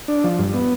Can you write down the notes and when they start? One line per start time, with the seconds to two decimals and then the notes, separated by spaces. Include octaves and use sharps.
0.08 D4
0.24 F3
0.39 G2
0.54 B3